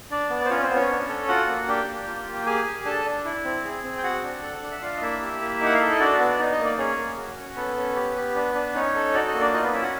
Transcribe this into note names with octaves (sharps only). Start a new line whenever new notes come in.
D4 D5
B3
C5
C#4 F4 C#5
C4 C5
B3
C#4 C#5
D4
A4
F4 F#4 F#5
A#3
D4 G4 G5
A#3
F4
A#3
G5
G4 G#4 G#5
G4
D4 A4 A5
D4
E4
C4
G#4
C4
G5
F#4 F#5
D4
A4
D4
E5
D4 F4 F5
D#5
A#3 E4 E5
G4
A#3
D#4 F#5
F5
A4 E5
D#5
D4 F#4 D5
B3
D#4
D#5
A#3
D5
C#4 G#4 C#5
A#3
F#4
C#4
B3 A4 B4
C#4
G4
G4
D4
D4
C#4 D#4 C#5
A4
F#4 D5
D#5
A#3
D4 D5
D#4 F4 D#5
B3 B4
C#4 E4 E5
F#4 F#5